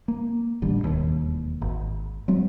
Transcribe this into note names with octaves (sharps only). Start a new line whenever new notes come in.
A#3
A1 D3 G3
E1 D#2
G#1
F#3 G#3 C4